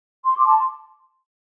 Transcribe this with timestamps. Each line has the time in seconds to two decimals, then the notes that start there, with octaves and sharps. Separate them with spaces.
0.24 C6
0.36 D6
0.45 A5 C6